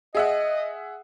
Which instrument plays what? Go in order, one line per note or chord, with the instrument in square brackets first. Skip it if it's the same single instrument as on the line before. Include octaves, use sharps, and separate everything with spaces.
[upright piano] G#4 E5 F#5 [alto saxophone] D#5